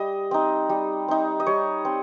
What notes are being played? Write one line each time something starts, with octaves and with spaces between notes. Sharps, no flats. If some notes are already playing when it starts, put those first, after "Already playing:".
Already playing: G3 D#5
C4 D#4
G3
C4 D#4
D#5
G3 C#5
C4